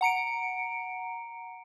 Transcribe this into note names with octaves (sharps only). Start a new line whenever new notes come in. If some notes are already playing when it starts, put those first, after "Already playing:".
F#5 A#5 C#7 D7